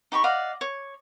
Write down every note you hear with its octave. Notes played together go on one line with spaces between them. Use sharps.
D#4 G4 B5 C#6
D5 D#5 F5 F#5
C#5